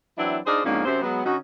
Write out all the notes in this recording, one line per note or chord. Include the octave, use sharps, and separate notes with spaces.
E3 F#3 C4 D4 E4
D4 D#4 F4 G#4 C5 D5
F2 G#2 C#3 A#3 C#4 D4
F#2 C3 C5
F#3 G#3 B3
D3 C#4 D#4 F#4